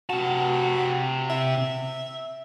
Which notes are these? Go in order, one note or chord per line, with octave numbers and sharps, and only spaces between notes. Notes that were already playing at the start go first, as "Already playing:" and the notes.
C3 F#4 A5
E5